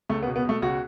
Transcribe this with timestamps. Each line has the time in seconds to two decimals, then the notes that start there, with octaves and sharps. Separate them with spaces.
0.09 C#2 A3
0.22 B3
0.27 B2
0.36 B3
0.45 B2 A3
0.62 C#2 F#4